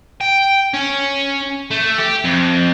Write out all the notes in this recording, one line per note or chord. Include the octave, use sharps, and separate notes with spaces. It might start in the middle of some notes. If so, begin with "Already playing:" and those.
G5
C#4
A3
G4
F2